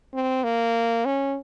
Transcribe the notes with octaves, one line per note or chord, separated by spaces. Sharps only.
C4
A#3
C#4